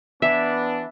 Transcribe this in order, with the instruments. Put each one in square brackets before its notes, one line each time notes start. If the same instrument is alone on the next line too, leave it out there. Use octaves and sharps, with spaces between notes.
[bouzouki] E3 [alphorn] B3 [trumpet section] D4 [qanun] E5